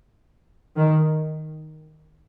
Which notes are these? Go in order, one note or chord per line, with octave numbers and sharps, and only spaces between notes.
D#3